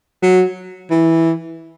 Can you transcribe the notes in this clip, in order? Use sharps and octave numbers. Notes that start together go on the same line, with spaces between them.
F#3
E3